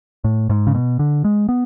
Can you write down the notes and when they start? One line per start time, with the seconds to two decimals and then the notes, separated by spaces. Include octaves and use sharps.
0.24 A2
0.50 G#2
0.67 C#3
0.74 B2
0.99 D3
1.24 G#3
1.49 B3